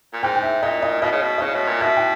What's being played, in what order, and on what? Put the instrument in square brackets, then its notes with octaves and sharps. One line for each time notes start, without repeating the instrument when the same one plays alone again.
[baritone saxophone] A#2
[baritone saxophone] G#2 [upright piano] G5
[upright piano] G5
E5
[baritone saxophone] A#2 [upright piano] D#5
[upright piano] D#5
[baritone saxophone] B2 [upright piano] D#5
[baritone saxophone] C#3
B2
[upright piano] D#5
[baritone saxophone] C#3 [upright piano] C#5
[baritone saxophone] B2
A#2
[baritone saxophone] B2 [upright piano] E5
[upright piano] G5